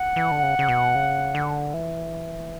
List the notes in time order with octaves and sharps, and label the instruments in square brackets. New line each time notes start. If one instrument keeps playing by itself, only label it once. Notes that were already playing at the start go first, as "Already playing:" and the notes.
Already playing: [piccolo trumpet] F#5
[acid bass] E3
D3
C#3
C#3
B2
C#3
D3
E3